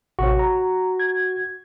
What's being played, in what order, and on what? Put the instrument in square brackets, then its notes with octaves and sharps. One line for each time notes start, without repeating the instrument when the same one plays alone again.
[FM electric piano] A1 C3 C#5 [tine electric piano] F#4
[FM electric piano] A#5
G#6